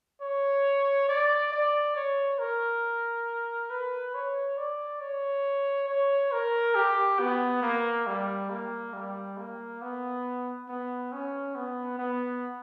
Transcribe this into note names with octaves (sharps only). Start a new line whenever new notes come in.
C#5
D5
D5
C#5
A#4
B4
C#5
D5
C#5
C#5
A#4
G4
B3
A#3
G3
A#3
G3
A#3
B3
B3
C#4
B3
B3